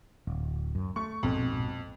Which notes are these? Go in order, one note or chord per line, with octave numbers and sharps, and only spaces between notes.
D1
F#2
A3 C#6
A#1 F2 G#2 B2